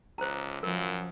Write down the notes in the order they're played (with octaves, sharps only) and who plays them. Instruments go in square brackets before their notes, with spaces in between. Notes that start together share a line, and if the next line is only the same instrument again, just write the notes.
[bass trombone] C#2 [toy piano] C5 A#5
[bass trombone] F#2 [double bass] F3 [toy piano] A#4